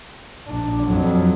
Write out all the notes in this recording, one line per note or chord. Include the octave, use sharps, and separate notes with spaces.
A#1 D4
F2 F#3